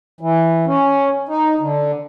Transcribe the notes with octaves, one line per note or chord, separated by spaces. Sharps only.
E3
C#4
D#4
D3